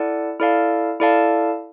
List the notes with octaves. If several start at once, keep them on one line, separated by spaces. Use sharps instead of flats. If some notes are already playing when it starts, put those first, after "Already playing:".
Already playing: E4 A4 D5 F#5 A5
E4 A4 D5 F5 A5
E4 A4 D5 F5 A5